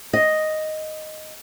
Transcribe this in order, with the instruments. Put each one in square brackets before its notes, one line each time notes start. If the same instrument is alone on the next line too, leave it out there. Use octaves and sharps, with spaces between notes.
[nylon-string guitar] D#5